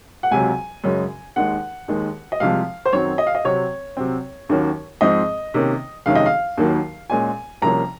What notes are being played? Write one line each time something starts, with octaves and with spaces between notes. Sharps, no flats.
F#5
C#2 C3 F#3 G#5
F#2 C#3 G#3 C#4
D#2 D#3 G#3 F#5
D#2 D#3 G#3
D#5
C2 C3 F3 G#3 F5
C5
F#2 D#3 F#3 C4 C#5
D#5
F5
D#5
C3 F#3 C4 C#5
C3 F#3 C4
D#2 D#3 F#3 A#3 C#4
G#2 F3 C4 D#5
C3 D#3 A#3 C#4
F2 C3 D#3 G#3 C#4 F5
D#5
F5
D#2 D#3 F#3 A#3
A#2 G#3 C#4 G#5
C2 C3 F3 A#3 C#4 A#5